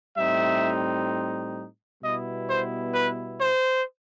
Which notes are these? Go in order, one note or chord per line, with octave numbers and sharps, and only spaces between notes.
A2 G3 C4 D#4 E5
B2 G3 B3 E4 D#5
C5
B4
C5